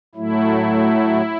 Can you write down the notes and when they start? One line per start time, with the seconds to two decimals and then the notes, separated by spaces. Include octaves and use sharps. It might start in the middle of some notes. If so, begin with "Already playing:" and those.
0.15 A2 F#3 A3 E4